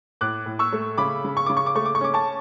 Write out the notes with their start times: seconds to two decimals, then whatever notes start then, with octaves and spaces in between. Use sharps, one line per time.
0.21 A2 D6 F#6
0.46 A2
0.59 C#6 E6
0.73 A3
0.98 C#3 B5 D6
1.25 C#3
1.37 C#6
1.46 C#3 D6
1.57 C#6
1.66 D6
1.75 A3 C#6
1.86 D6
1.95 C#6
2.01 C#4 D6
2.14 A5 C#6